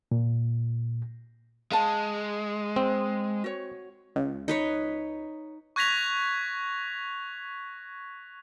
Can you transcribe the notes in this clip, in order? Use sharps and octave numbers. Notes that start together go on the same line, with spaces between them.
A#2
G#3 F5 A5
C4
F#4 C#5
C#2
D#4 B4 C#5
C#6 F#6 G#6 A#6 B6 F7